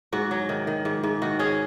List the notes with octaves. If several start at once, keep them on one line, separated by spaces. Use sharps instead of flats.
G#2 F#4
F#3
D#3
D#3
G#2
G#2
D#3 F#4
C#4 G#4